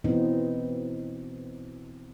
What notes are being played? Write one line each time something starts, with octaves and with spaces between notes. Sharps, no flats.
B2 E3 B3 C4 D#4